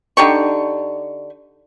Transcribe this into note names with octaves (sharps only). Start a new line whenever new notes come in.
D3 D#4 G4 C#6